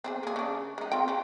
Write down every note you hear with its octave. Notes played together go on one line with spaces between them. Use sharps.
C4 F4 G#4
A#3 G#4
C#3 D4
G#3 D#4
C4 F4 G5
C#3